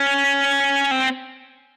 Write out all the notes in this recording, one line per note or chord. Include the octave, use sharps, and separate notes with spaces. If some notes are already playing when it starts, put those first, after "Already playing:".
Already playing: C#4
C4